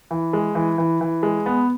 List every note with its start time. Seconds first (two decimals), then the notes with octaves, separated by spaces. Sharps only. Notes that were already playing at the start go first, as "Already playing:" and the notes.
0.11 E3
0.33 G#3
0.55 E3
0.78 E3
1.01 E3
1.23 G#3
1.46 B3